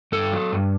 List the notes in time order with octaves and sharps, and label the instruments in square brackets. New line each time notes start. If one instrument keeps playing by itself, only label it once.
[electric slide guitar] G2 A4
F#3
G2